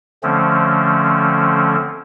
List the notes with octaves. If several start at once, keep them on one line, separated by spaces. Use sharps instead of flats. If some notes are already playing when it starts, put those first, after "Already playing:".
D3 F3 A3 C4 C#4